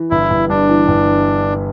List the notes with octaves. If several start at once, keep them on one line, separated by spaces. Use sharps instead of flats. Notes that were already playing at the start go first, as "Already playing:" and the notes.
Already playing: E3
G1 E4
G1
G2 D4
E3
G1